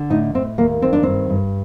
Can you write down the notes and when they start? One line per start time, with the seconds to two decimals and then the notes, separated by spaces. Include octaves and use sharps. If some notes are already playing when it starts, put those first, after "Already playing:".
Already playing: D3
0.10 A2 D#4
0.34 A2 C4
0.58 D#2 A#3
0.82 D#3 C4
0.93 D4
1.03 G2 C4
1.30 G2